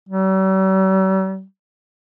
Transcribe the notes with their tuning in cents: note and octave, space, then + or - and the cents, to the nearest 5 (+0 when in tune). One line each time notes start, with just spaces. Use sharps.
G3 -45